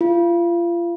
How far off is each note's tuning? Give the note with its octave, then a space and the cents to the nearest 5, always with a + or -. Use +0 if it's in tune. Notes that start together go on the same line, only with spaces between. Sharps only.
F4 -30